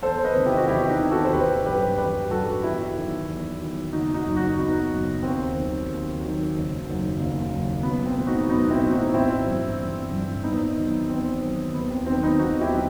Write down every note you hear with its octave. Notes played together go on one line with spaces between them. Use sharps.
E2 A4 C5
B4 D#5
C3 D#3
E4 G4
F#4
E2 E4 G4
D#4 F#4
C3 D#3
F#4 A4
C5
A1 G4 B4
G2 F#3 G4 B4
A1 G4 B4
G2 F#3 F#4 A4
E2 E4 G4
D#3 F#3
E2
D#3 F#3
F#1 D#4 F#4
D#4 F#4
F#2 F#3
D#4 F#4
F#1 B3 D#4
F#2 F#3
D#2 C4
D#3 F#3
D#2
D#3 F#3
F#1
F#2 D#3 F#3
F#1
F#2 D#3 F#3
B1 B3
C4
A2 E3
D#4 F#4
B1 B3 D#4
C4 E4
A2 E3
D#4 F#4
A1 C4 E4
G2 E3
A1
G2 E3
E2 B3 D#4
D#3 F#3
E2 C4
D#3 F#3
D#2 B3
C4
D#3 F#3 C4
B3 D#4
D#2 D#4 F#4
E4 G4
D#3 F#3